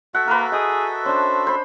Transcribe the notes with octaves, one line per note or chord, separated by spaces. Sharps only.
F#4 A4 E5 F#5
A#3 A#4 B4
G#4 D#5 G5 D#6
C#4 D4 C5
C5 B5